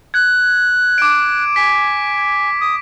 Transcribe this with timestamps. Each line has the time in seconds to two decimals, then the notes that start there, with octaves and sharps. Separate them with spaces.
0.14 F#6 G#6
0.98 D6 D7
1.56 G#5 B6
2.61 D#6